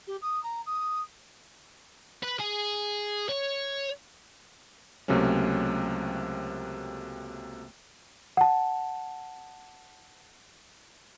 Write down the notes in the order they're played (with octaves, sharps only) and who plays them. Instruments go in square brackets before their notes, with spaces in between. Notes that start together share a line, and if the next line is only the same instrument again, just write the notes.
[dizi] G4
D#6
A#5
D#6
[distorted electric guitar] B4
G#4
C#5
[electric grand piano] C#2 C3 F#3 A3 A#3 C#4
[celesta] F#5 A5